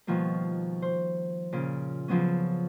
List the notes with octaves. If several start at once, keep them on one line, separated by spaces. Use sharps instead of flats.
B2 D#3 F3 G3 A#3
C5
A#2 C#3
C#3 F3 F#3 B3 C#4